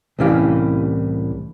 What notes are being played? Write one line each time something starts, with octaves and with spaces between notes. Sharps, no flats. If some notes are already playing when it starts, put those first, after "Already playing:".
C2 A2 E3 C#4 G4 F5